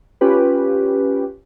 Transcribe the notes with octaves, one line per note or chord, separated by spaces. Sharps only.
C#4 F4 G4 B4